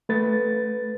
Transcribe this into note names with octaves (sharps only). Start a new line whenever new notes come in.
A3 B4 A6